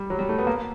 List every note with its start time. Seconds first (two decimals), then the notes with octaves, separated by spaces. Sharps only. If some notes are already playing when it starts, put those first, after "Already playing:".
Already playing: G3
0.10 F#3
0.19 G3
0.29 A3
0.38 B3
0.47 A#3